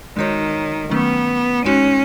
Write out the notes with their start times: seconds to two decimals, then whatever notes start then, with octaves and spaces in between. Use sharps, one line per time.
0.17 D#3 G#3 D#4 F#4 C#5
0.91 D#3 F#3 A3 B3 C#4
1.66 G#3 C#4 D#4 F#4